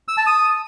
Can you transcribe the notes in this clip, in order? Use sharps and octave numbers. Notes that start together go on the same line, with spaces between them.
E6
A5
D#6